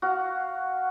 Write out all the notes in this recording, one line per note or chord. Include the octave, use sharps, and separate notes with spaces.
F#4 F5